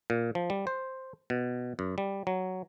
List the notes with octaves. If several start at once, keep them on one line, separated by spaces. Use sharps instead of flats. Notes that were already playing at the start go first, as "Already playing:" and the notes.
A#2
F3
G3
C5
B2
F#2
G3
F#3